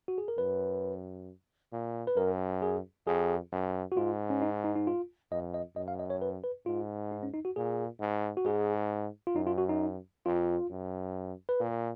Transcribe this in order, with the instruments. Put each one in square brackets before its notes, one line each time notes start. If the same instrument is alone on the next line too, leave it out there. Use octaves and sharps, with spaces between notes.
[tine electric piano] F#4
G#4
A#4
[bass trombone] F#2 [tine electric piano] B4
[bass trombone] A#2
[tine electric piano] B4
[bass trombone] F#2 [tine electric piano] A#4
[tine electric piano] G#4
[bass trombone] F2 [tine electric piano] G#4
[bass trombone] F#2
[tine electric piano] F#4
[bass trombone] G#2 [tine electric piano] F4
[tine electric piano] C#4
D#4
D#4
D#4
F4
[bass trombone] F2 [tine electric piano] D#5
[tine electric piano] D#5
[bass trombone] F#2 [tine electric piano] D#5
[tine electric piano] F5
D#5
C#5
B4
B4
[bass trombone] G#2 [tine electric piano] F4
[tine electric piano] D#4
C#4
D#4
F#4
[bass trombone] A#2 [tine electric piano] G#4
[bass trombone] G#2
[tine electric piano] F#4
[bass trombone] G#2 [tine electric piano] G#4
[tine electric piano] F4
[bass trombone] F#2 [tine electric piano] D#4
[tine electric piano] F4
F#4
D#4
[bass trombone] F2 [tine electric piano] F4
[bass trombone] F#2
[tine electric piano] B4
[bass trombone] A#2 [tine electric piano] A#4